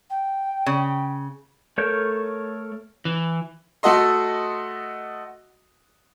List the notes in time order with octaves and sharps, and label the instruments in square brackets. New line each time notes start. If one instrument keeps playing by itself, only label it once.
[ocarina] G5
[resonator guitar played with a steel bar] C#3
[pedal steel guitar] A3 A4 A#4 C#5 G6
[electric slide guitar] E3
[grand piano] A3 F#4 A4 D#5 C6